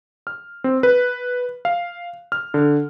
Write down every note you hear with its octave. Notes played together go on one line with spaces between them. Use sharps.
F6
C4
B4
F5
F6
D3